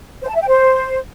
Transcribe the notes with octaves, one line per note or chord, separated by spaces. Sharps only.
C5
A5
E5
G5
C5